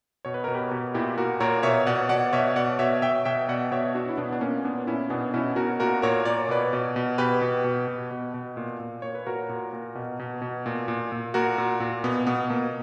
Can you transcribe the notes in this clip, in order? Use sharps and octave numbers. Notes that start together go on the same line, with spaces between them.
B2 C#5
B4
B2 A#4
G4 B4
B2
A#2 E4 G4
A#2 F#4 A#4
A#2 A#4 C#5
B2 C#5 E5
B2 D5 F#5
B2 D5 F#5
B2 C#5 E5
B2 D5 F#5
B2 C#5 E5
B2 E5 G5
B2 E5 G5
B2 D5 F#5
B2 C#5 E5
B2 D4 F#4
E4
B2 B3 D4
D4
A#2 A#3 C#4
A#2 B3 D4
A#2 C#4 E4
B2 B3 D4
B2 C#4 E4
B2 F#4 A#4
A#2 F#4 A#4
A#2 A#4 C#5
A#2 D5
C#5
B2 B4 D5
B2
B2
B2 G4 B4
B2
B2
B2
B2
B2
A#2
A#2
A#2 C#5
B4
A#2 F#4 A#4
A#2
A#2
B2
B2
B2
A#2
A#2
A#2
A#2 F#4 A#4
A#2
A#2
B2 B3
B2 B3
B2 A#3